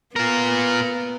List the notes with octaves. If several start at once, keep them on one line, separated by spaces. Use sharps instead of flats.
B3 F4 A#4